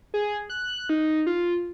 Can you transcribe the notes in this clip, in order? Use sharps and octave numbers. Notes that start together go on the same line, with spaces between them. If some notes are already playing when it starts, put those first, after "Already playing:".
G#4
F#6
D#4
F4